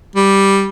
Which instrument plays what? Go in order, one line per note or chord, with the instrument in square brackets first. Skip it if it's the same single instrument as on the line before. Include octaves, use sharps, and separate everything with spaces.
[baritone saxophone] G3